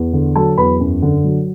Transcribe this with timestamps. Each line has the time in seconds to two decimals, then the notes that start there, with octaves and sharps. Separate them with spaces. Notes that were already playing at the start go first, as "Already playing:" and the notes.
Already playing: E2
0.13 D3
0.36 F#3 A4 A5
0.57 E2 B4 B5
0.80 F#2
1.02 D3
1.24 F#3